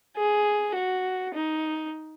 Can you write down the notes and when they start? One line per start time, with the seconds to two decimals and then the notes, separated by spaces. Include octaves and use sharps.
0.16 G#4
0.74 F#4
1.34 D#4